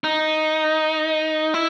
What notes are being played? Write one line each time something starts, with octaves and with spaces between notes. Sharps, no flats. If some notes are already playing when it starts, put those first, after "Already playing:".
D#4
E4